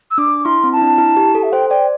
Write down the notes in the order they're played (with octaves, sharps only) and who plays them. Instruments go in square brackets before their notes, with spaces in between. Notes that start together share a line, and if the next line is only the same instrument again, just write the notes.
[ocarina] E6
[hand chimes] D4 [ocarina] D6
[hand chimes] E4 [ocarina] C6
[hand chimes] C4
[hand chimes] E4 [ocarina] A5
[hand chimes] D4
E4
G4
A4
[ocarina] E5
[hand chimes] C5 [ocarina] G5
[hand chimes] D5 [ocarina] G5